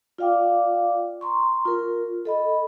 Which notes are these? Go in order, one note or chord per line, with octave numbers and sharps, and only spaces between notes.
F4 D5 F5 G5 D6
A#5 C6 C#6
F4 A#4
A4 D#5 B5